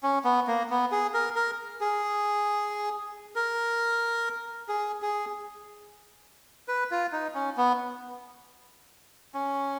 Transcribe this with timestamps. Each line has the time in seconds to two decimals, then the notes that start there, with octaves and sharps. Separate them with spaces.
0.03 C#4
0.25 B3
0.47 A#3
0.70 B3
0.92 G#4
1.14 A#4
1.35 A#4
1.81 G#4
3.36 A#4
4.69 G#4
5.02 G#4
6.68 B4
6.91 F4
7.12 D#4
7.34 C#4
7.57 B3
9.34 C#4